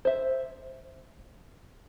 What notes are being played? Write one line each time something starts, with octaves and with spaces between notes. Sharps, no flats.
C5 E5